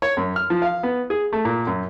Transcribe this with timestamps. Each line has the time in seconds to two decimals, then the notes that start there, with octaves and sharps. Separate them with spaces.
0.02 C#5
0.17 F#2
0.36 F6
0.50 F3
0.62 F5
0.83 B3
1.10 G#4
1.33 A3
1.45 A#2
1.67 F#2